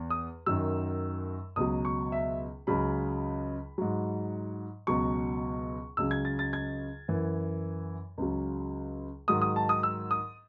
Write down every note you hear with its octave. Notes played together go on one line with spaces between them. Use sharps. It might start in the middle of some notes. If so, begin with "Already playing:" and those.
Already playing: E2
D#6
F#2 D#3 F#3 E6
C#2 B2 F#3 D#6
C#6
E5
C#2 C#3 F#3 B5
G#2 F#3
C#2 B2 F#3 C#6
C#2 C#3 F#3 E6
G#6
A6
A6
G#6
F#2 E3
C#2 C#3 F#3
G#2 D#3 F#3 D#6
D#6
A5
D#6
E6
D#6